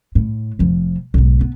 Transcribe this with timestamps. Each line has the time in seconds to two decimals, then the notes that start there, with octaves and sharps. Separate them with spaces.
0.15 A2
0.59 F1 F3
1.14 B1 G#2
1.41 B3